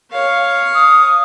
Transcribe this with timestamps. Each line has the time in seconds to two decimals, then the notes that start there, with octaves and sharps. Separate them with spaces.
0.12 C#5 F5
0.75 D#6